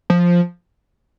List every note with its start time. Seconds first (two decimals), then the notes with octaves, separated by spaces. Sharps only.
0.10 F3